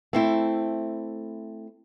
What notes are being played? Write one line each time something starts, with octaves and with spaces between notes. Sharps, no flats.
A3 C4 E4